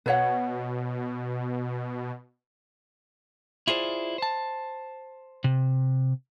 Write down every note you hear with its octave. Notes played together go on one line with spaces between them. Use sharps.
B2 B4 C#5 F#5
E4 F4 G#4 C5 D5
C5 A5
C3